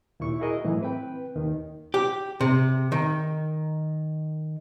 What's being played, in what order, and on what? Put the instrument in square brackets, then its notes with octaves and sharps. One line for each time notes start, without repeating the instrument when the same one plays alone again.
[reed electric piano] D#2 A#2 E4 C#6
E4 F#4 G#4 A#4 D#5
A2 E3 F#3
C4 B4 G5
D#2 D#3
[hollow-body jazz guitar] G4
C3
D#3